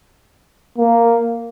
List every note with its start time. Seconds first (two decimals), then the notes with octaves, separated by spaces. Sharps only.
0.78 A#3